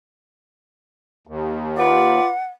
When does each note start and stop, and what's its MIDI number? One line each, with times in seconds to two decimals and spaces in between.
1.27 2.20 39
1.77 2.28 65
1.77 2.28 71
1.77 2.28 74
1.77 2.45 78